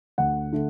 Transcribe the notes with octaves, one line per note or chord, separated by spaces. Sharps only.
D2 F#5
D3 A3